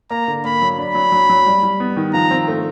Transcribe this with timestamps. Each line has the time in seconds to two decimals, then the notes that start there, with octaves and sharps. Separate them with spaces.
0.11 A#3 A#5
0.28 D3
0.45 A#3 B5
0.62 F#3
0.78 D4 B5
0.95 F#3
1.12 F#3
1.29 F#3
1.46 G3
1.63 G3
1.80 B3
1.97 D#3
2.13 F3 A#5
2.31 C4
2.48 A3